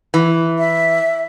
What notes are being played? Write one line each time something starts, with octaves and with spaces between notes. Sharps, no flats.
E3
E5